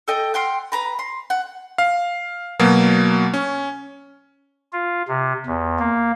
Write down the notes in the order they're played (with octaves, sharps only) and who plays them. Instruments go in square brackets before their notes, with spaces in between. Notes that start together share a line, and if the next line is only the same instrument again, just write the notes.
[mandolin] A4 D#5 G5
F#5 G5 C6 F6
B4 A#5 B5
C6
F#5
[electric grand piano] F5
B2 F#3 A#3
C#4
[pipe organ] F4
C3
E2
A#3